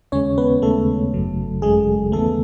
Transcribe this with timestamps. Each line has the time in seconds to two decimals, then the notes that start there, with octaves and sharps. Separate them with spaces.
0.12 D#2 C#3 G#3 C#4 C#5
0.38 B3 B4
0.62 D#2 C#3 G#3 A3 A4
1.13 G#1 F#2 C#3 F#3
1.62 G#1 F#2 C#3 F#3 G#3 G#4
2.12 D#2 C#3 E3 A3 B3 A4